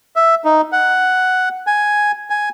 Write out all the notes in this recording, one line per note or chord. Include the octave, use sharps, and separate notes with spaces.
E5
D#4
F#5
G#5
G#5